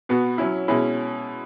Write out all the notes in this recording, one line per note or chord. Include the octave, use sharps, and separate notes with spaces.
B2 B3 F#4
F#3 C#4 E4
B2 G#3 C#4 E4